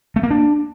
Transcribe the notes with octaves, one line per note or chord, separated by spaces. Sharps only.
A3
A#3
D4